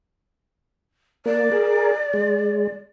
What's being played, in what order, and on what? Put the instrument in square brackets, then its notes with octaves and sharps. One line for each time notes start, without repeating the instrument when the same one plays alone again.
[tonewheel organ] A#3 [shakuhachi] D5
[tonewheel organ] G#4 A#4
G#3